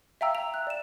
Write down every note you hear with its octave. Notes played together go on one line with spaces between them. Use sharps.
E5 F5 G5 A#5 E6
F7
F#6
D5 E7